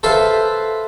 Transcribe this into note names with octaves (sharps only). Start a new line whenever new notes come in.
A4 B4 C5 E5 F5